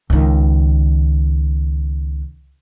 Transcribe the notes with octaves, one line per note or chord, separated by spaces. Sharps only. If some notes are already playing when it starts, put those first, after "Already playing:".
C#2 D#3